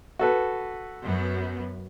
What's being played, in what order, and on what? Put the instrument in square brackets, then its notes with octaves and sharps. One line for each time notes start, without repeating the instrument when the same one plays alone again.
[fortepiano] F#4 A4 B4
[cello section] F#2 B3